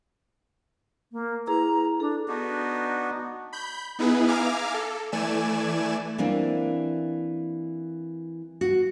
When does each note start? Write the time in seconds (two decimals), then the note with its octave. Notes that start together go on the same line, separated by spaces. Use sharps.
1.12 A#3
1.47 E4 G#4 B4 A#5
2.00 D4 A4
2.28 B3 D4 D#4 F#4
3.53 B5 G6
3.99 B3 D#4 E4 G#4 B4
4.28 E5 F5 G#5 A#5 D6 F6
4.74 A4
5.12 E3 A3 D5 G#5 E7
6.18 E3 A#3 C4 D4
8.61 F#4